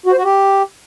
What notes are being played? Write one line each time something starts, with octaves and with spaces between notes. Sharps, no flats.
F#4
C5
F#4
G4